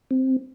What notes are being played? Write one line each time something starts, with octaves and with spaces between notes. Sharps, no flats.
C4